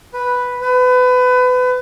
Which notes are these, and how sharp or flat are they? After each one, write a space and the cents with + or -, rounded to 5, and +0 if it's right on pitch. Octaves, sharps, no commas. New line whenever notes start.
B4 +0
B4 +30